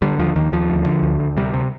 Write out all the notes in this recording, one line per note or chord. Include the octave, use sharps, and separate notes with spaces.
D3 G3
D#2 F3
D#2 D#3
D#2 F3
D2
D3
D2
D2
C3 G3
C3